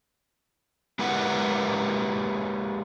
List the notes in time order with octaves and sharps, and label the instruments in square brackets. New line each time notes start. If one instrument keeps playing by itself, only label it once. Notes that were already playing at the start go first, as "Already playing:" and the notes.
[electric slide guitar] G#3 A#3 E4 G4 B4 F#5